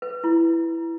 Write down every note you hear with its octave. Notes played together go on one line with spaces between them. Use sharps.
B4
E4